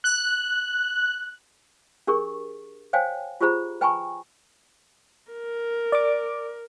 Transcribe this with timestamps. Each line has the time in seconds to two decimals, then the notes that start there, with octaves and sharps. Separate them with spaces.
0.04 F#6
2.07 D4 G4 G#4 A#4 C#6
2.93 C5 C#5 F5 G5 G#5
3.41 F4 G4 G#4 C5 A#5 B5
3.81 B4 G5 G#5 A#5 B5 C#6
5.32 A#4
5.92 D5 D6